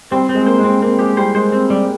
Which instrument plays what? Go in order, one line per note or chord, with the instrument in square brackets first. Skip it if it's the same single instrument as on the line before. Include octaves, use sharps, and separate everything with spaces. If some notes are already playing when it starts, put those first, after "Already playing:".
[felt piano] G3 [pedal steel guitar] C4
[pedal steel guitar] C4
[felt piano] G#3
[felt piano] A#3 [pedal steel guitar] C5
[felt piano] G#3
[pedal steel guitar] C4
[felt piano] A#3 [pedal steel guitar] C4
[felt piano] G#3 [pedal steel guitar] G4
[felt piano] G3 [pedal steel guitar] C5
[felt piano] G#3 [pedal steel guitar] C5
[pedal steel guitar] C4
G3